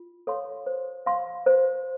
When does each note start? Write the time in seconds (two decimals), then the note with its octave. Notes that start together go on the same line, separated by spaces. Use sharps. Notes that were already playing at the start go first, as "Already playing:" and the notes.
Already playing: F4
0.27 A4 C#5 F5 C6
0.66 C5
1.06 F5 C6
1.46 C5